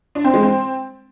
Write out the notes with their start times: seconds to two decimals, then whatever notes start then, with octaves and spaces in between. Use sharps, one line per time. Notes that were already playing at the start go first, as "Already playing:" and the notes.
0.15 D4
0.24 C4
0.34 G#3
0.43 C4